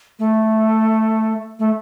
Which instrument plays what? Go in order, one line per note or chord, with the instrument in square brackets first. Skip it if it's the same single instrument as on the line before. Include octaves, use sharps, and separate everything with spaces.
[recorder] A3
A3